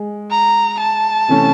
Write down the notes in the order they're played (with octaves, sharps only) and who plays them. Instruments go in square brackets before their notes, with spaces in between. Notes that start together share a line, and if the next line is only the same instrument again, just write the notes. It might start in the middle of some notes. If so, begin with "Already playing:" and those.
Already playing: [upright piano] G#3
[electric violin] A#5
A5
[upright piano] C3 E3 A3 C#4